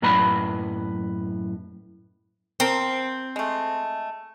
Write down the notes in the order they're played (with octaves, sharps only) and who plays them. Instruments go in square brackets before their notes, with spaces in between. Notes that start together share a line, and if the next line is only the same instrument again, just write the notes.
[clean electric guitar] F#2 A2 F#3 B4 A#5 B5
[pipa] F3 A#4 C5 [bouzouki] C4
[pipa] G#3 A3